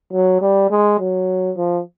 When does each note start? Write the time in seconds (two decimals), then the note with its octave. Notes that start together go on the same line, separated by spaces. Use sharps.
0.13 F#3
0.41 G3
0.70 G#3
0.99 F#3
1.57 F3